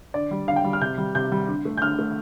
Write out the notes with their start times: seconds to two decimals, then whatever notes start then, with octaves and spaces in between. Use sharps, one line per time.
0.14 D3 D5
0.31 G3
0.48 D3 F5
0.56 G5
0.64 G3
0.73 F6
0.81 C3 G6
0.98 G3
1.15 C3 G6
1.32 G3
1.48 D3
1.65 A3
1.77 G6
1.81 D3 F6
1.99 A3